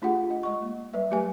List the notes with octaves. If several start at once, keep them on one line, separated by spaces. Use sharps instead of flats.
A3 D4 F4 G4 G#4 F#5
D#5 F#5
G#3 D#5 C#6
A#3
G3 B4 E5
F#3 A3 G4 B4 G#5